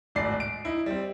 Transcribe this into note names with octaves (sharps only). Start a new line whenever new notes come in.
D1 G#1 D5 C7
D7
D#4 E4
G3 C4